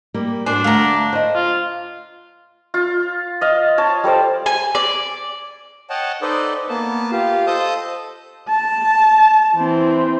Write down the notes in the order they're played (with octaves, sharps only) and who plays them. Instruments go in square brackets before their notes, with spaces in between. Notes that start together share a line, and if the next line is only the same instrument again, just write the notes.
[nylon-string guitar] G3 A#3 G4
[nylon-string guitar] G#2 F#4 G#5 [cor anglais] D4 [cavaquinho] C5
[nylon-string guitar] D2 A3 F#5 [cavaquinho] F5 A#5
[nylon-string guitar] C5 D#5
[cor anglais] F4
[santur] F4
D#5 F5
C#5 A5
G3 A4 C5 D5
[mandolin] G#5
D5
[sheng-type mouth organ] C#5 D#5 F#5 G5 A5
D#4 A4 B4 C5 D5 D#5
A#3 B3 A5
F4 G4 F5
A4 C5 D#5 A5 D#6 G6
[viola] A5
E3 C4